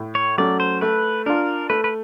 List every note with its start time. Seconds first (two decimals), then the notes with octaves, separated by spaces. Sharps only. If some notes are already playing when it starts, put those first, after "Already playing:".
Already playing: A2
0.15 C#5
0.38 F#3 A3 C#4 D5
0.60 C5
0.81 A3 B4
1.26 D4 F4 A#4
1.70 A3 B4
1.84 B4